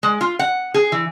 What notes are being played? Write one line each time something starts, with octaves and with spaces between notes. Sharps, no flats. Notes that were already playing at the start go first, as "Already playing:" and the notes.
G#3
F4
F#5
G#4
E3